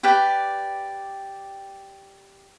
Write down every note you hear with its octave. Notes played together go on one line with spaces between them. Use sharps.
G4 B4 D5 G5